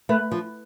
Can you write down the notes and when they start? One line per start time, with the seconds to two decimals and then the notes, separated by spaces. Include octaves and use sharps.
0.09 A3 B4
0.31 F3